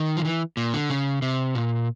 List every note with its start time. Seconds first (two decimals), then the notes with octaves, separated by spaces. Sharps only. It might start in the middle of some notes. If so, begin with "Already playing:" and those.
Already playing: D#3
0.17 F3
0.25 E3
0.57 A#2
0.74 D3
0.90 C#3
1.22 C3
1.55 A#2